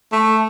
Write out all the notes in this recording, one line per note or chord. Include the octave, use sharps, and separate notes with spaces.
A3